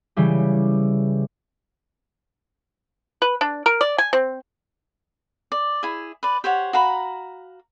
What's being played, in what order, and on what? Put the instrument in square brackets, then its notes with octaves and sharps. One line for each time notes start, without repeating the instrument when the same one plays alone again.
[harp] C#3 E3 G3 G4
[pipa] B4
D4
A#4
D5
G#5
C4
[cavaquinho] D5
E4 G#4
B4 D5
G4 C5 C#5 F#5
F#4 F5 A#5 B5